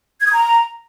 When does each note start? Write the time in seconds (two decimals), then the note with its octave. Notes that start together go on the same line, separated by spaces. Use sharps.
0.21 G#6
0.27 D#6
0.33 A#5